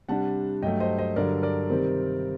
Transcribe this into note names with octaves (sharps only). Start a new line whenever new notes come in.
C3 G3 D4 F#5 A5
G2 F#3 A3 D#5 G5
C5 D#5
C5 D#5
G2 D3 F#3 A#4 D5
A#4 D5
C3 D#3 G3 C4